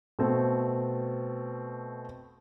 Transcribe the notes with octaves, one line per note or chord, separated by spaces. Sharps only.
B2 A3 C4 A4